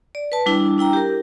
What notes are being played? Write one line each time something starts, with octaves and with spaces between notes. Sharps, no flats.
D5
B4 A5
G3 D4 E4
D4 E4 G5 A#5
G4 A#4